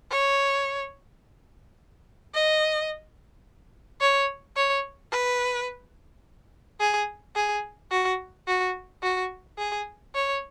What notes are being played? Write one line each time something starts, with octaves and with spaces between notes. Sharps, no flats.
C#5
D#5
C#5
C#5
B4
G#4
G#4
F#4
F#4
F#4
G#4
C#5